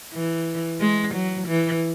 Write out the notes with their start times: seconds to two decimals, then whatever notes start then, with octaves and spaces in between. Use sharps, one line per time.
0.13 E3
0.80 G#3
1.14 F#3
1.47 E3